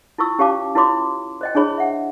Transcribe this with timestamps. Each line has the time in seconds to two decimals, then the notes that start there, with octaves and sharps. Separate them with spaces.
0.18 E4 F4 B4 C#6 E6
0.39 C#4 G4 C#5 F5 A5 D6
0.75 E4 F4 B4 C#5 C6 D6
1.41 C5 D#5 G5
1.55 D4 E4 G#4 C#5 B5
1.78 E5 F#5